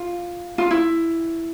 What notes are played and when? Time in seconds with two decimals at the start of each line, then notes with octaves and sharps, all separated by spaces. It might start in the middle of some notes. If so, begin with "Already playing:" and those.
Already playing: F4
0.58 F4
0.71 E4